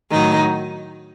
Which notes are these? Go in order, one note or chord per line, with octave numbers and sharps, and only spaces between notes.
A2 D#3 F#3 D#4